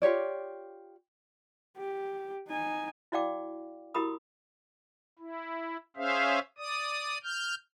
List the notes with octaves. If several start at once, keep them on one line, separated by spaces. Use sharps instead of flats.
F4 G4 C#5 D5
G4
D#4 G#5
E4 F#4 D5 F5 G5 D6
E4 F#4 G4 A#4 B5 D#6
E4
C#4 G#4 C5 E5 F5
D5 D#6
F6 G6